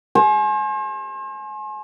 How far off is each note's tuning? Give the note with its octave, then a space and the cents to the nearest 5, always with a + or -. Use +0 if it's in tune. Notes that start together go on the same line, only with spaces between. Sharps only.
C5 +40 G#5 +35